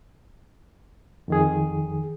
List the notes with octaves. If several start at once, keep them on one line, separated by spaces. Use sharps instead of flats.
F2 D#3 G#4